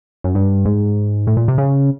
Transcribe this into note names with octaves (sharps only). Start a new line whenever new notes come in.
F#2
G2
G#2
A2
A#2
C3
C#3